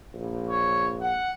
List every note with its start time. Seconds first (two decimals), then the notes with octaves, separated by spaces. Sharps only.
0.14 A#1
0.49 C#5
1.01 F#5